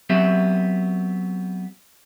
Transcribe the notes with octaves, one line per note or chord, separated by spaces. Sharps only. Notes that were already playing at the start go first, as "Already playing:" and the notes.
F#3 B3 C4 G4 E5